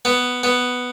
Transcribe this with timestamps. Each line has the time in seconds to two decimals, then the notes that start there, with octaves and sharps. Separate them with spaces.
0.05 B3
0.43 B3